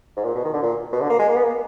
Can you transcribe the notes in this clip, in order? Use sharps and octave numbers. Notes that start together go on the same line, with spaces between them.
G#2
A#2
B2
D#3
D3
A#2
B2
D3
A#3
G#3
A#3
B3
A#3